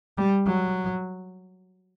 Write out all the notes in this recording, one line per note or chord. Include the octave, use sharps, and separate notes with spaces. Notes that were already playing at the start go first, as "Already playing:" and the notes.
G3
F#3